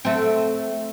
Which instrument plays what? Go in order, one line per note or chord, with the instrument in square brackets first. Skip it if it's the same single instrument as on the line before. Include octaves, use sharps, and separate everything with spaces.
[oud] A3 C4